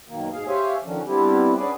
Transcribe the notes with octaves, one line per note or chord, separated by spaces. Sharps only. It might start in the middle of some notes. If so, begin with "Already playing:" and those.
F#2 B2 D#3 A#3
G#2 B2 G#4 F5
G4 C5 C#5 E5 F5 G#5
D3 D#3 F3 C#4 D4
G3 B3 C4 D4 E4 G4
C#4 D4 F#4 G#4 B4 D5